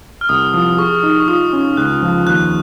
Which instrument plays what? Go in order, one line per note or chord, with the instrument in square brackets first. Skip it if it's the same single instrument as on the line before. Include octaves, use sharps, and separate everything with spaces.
[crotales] F6
[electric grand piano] C2 [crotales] D#6
[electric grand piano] F3 [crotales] D#6
[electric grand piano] G#4 [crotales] C#6
[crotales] C#6
[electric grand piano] D#4
[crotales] C#6
[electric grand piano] F4 [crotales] D#6
[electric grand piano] C#4 [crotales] C#6
[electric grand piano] C#2 [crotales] F#6
[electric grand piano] F3
[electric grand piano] D#2 [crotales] F#6